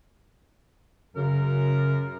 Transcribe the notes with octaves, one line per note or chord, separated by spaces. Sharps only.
F#2 C#3 A#4